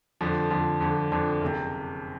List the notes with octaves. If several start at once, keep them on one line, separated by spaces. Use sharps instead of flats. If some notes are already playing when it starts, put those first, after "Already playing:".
F2 D3 F3
F2 D3 F3
F2 D3 F3
F2 D3 F3
F#1 C3